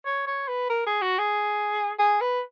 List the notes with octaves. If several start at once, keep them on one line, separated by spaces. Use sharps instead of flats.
C#5
C#5
B4
A#4
G#4
F#4
G#4
G#4
B4